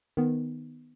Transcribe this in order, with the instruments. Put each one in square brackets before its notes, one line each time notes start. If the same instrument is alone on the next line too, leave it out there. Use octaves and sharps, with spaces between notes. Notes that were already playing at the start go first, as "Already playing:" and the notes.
[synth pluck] D#3 B3